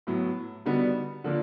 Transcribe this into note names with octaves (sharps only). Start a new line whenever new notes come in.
A2 F#3 B3
D3 G3 B3 D#4 F#4
D3 F3 A#3